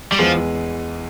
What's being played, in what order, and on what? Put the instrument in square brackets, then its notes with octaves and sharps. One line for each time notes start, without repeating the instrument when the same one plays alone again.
[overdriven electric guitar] G3
[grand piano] E2 E3 G#3 [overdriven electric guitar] F3